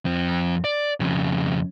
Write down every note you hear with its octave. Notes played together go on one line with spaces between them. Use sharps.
F2 C4
D5
F2 C#3